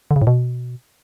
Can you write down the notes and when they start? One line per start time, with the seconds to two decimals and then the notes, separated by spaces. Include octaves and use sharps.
0.11 D3
0.16 C#3
0.22 A2
0.27 B2